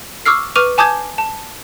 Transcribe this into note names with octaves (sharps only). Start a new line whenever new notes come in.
C#6 D6 E6 F6 C7
B4 C#6 D6 F6 D#7 F7
G#5 A5 D6 D#6 G6 G#6
A5